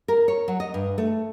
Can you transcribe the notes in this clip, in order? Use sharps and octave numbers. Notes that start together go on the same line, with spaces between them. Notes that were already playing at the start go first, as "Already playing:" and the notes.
A#4
C#5
F#3
D#5
G2
A3